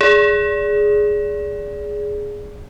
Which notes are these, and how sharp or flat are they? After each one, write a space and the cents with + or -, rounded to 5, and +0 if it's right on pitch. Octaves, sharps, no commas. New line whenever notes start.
G#4 +0 D5 -25